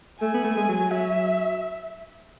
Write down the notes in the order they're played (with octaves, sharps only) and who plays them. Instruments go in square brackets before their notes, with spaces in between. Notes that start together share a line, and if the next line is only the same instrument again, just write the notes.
[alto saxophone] A3 [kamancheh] G#5
[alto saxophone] B3
A3
G#3
F#3
F#3
[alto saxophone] F#3 [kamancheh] E5